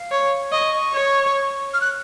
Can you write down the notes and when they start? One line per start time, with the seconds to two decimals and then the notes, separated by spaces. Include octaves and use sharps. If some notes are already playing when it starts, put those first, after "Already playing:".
Already playing: F5
0.12 C#5
0.52 D#5 C#6
0.93 C#5
1.74 F6
1.81 F#6